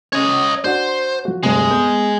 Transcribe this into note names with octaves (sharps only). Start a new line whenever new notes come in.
C#4 C#5 D#5
D4 F#4 C5 F#5
F3 F#4
F1 D2 G2 G#3
B3 G6